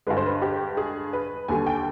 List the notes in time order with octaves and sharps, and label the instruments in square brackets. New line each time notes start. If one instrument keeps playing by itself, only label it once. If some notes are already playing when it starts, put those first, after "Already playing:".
[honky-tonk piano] G2 D3 G#3 B4
C5
B4
G4
G#4
B4
D#2 D3 G3 G#5
G5